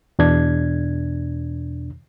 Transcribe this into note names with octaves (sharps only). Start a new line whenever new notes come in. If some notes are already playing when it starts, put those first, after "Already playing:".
E2 B2 D4 G#6